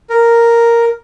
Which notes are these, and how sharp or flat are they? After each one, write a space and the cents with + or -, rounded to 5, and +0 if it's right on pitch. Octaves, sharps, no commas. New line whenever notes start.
A#4 +0